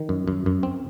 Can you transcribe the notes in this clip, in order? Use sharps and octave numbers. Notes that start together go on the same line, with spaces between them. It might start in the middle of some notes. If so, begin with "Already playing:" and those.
Already playing: D#3
F#2
F#2
F#2
C4